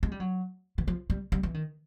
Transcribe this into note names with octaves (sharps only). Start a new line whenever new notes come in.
G#3
G3
F#3
E3
F3
G3
G3
E3
D#3